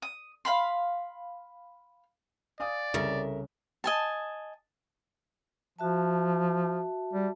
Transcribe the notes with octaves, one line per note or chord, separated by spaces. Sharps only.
D#6
F5 B5 C6
D5 F5 G#5 D#6
C2 C#3 A4 A#4 E5
D#5 G#5 A5
F3 F#4 E5 A5
G3